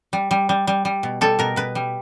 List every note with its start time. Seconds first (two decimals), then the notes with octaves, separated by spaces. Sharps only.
0.13 G3
0.31 G3
0.49 G3
0.67 G3
0.85 G3
1.03 B2
1.21 G3 A4
1.39 B2 A#4
1.56 B2 B4
1.75 G3